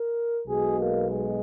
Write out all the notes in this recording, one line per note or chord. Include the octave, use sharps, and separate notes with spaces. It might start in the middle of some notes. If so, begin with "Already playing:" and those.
Already playing: A#4
B1 B2 G#3 G#4
A#3
G#3